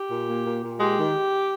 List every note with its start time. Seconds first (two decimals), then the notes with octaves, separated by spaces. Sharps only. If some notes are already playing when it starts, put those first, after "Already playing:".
Already playing: G4
0.11 A#2
0.28 A#3
0.46 A#2
0.63 A#2
0.80 G#3 G4
0.98 D#3